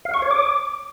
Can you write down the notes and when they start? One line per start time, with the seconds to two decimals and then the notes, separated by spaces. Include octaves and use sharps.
0.05 F5
0.14 C#6
0.22 C#5
0.31 D6